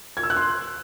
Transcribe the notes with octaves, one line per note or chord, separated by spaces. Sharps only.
G#6
E6
F#6
C6